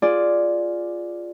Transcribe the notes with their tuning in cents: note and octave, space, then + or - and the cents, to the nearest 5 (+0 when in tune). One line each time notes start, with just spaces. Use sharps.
F4 +0 G#4 +0 D5 +0